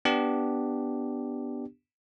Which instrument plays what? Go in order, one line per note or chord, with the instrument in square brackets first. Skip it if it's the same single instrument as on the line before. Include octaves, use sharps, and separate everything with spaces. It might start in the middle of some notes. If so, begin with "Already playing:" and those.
[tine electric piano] B3 D4 G4